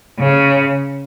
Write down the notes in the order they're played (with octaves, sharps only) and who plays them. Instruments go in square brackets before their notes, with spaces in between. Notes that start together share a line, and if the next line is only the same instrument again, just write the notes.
[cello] C#3